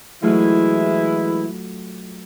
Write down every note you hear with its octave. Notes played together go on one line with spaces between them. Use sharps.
E3 F#3 G#3 A3 E4 F4